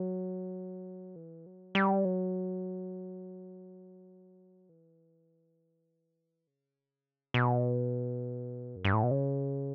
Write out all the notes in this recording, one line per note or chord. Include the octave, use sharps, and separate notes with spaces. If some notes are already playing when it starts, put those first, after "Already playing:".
Already playing: F#3
E3
F#3
G3
F#3
E3
C#3
B2
F#2
G2
A2
B2
C#3